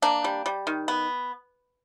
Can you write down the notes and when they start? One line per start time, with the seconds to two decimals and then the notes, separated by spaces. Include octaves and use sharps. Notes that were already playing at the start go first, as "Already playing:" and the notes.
0.02 A#3 D4
0.24 G3
0.46 G3
0.67 D#3
0.88 B3